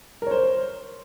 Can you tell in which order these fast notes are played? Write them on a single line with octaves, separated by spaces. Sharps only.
A#4 C#5 C5